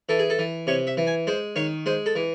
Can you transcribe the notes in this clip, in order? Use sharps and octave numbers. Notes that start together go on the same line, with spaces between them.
E3 A4
G#4
A4
E3
C3 C#5
E5
E3
G#5
G#3 C5
D#3 C#5
G#3 C5
A4
E3